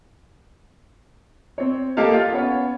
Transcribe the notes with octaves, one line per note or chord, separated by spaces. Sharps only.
C4 C#5
A#3 G4 A4 D#5 F5
F4 F5
B3 C#4 C#5